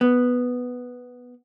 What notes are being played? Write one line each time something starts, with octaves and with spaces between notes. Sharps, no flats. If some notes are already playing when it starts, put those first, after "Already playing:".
B3